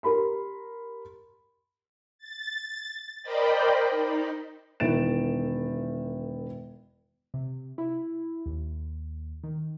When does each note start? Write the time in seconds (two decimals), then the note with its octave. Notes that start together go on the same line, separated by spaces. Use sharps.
0.03 G4 A#4 B5 C6
2.18 A6
3.23 A#4 C5 D5 D#5 G5 B5
3.90 D#4
4.80 E1 D#3 E4 A6 D7 E7
7.34 C3
7.78 E4
8.46 D#2
9.44 D#3